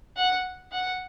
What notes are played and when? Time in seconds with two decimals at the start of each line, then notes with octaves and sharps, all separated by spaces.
0.16 F#5
0.72 F#5